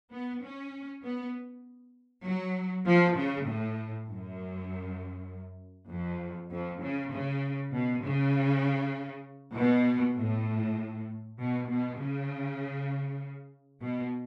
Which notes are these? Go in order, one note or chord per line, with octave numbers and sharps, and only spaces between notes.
B3
C#4
B3
F#3
F3
C#3
A2
F#2
F2
F2
C#3
C#3
B2
C#3
B2
A2
B2
B2
C#3
B2